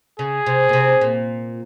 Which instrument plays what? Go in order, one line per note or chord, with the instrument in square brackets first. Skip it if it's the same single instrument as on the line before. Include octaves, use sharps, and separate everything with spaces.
[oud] C#3 [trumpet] G#4
[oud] C3
A#2
C3
A#2